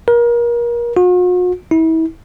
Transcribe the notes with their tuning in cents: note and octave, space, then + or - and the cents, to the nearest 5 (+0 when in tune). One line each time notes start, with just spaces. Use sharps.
A#4 +30
F#4 -45
E4 -35